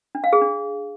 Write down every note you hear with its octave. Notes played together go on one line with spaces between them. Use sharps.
D4
F5
G#4
D4